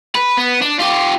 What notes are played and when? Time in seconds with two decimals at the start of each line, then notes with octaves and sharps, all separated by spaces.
0.15 B4
0.37 B3
0.62 D4
0.80 F4 G4